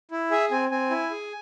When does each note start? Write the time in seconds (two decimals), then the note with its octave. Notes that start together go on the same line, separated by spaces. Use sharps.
0.11 E4
0.31 G#4 E5
0.51 C4 G#5
0.71 C4 G#5
0.90 E4
1.10 G#4